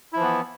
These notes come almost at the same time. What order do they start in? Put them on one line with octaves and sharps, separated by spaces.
E4 F3 E3 B3